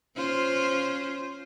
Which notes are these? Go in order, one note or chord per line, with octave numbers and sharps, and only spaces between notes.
C#4 F4 C5